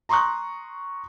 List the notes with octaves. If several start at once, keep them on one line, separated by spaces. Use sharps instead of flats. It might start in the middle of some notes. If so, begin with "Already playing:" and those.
A#5 C6 C#6 D#6 F#6